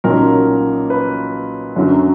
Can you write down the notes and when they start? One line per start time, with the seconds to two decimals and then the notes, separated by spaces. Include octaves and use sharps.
0.04 B1 A#2 F#3 A#3 C#4 A#4
0.90 B4
1.76 F#2 D3 F#3